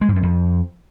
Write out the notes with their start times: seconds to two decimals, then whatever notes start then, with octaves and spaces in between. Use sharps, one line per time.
0.01 G#3
0.09 G#2
0.16 F#2
0.23 F2